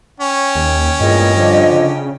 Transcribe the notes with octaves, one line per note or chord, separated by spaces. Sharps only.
C#4 G5
D#2
E2 G2 A#2 G#3 D#5
D3 F3 D4
C#3